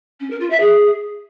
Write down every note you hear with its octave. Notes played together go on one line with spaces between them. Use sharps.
C#4
A#4
F4
E5
G#4